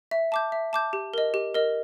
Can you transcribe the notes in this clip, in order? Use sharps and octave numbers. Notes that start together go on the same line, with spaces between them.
E5
A5 D6 G6
E5
A5 D6 G6
G4
A#4 D#5
G4
A#4 D#5